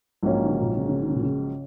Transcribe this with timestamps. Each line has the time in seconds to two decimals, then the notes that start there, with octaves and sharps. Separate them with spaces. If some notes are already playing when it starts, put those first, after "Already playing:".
0.23 A#1 G#2 F#3 A#3 C#4
0.43 D#3
0.49 C#3
0.62 A#2
0.76 C#3
0.89 C#3
1.02 D#3
1.09 C#3
1.16 A#2
1.22 C#3